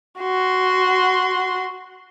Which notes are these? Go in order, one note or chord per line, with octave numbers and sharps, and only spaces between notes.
F#4 C6